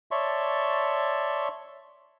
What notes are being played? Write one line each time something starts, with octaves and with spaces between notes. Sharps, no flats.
C#5 D5 E5 A5 C6 C#6